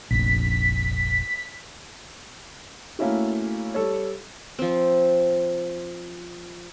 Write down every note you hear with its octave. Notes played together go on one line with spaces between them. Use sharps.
F1 A#1 B6
A3 A#3 C#4 E4 F#4
G3 A4 C#5
F3 C4